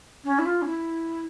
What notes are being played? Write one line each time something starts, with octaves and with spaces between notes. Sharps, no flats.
C#4
E4
F4
C#4
E4